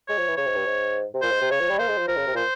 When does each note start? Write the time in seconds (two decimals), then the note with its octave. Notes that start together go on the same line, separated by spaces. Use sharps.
0.08 G#3 C#5
0.18 F3
0.28 E3
0.37 C#3 C#5
0.47 G#2
0.56 G2
0.66 G#2
1.14 C3
1.22 A#2 C5
1.31 G#2
1.41 C3
1.51 C#3 C#5
1.61 F3
1.70 G3
1.79 A#3 C5
1.88 G#3
1.98 F3
2.08 F3 A#4
2.17 C#3
2.27 C3
2.35 A#2 C5